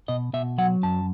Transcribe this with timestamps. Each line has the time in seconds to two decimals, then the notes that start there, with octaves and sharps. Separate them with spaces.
0.08 B2 D#5
0.33 B2 E5
0.58 F#3 F#5
0.83 F#2 A5